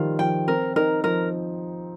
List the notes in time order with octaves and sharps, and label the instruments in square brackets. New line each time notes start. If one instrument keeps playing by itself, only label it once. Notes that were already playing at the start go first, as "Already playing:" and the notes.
Already playing: [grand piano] D#3 F3 G3 [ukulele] F4
[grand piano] F3 [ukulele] G5
[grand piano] C4 [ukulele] A#4
[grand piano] D#4 [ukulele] A#4
[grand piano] F3 [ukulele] A#4